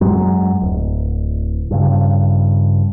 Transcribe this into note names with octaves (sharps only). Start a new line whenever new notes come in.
F#2 F#3 G#3
D1
G2 C#3